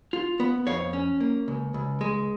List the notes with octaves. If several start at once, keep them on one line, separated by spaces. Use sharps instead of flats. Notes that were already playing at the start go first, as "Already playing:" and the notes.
F4
B3
F2 C#5 F5
C#4
A#3
C#2
C#2
G#3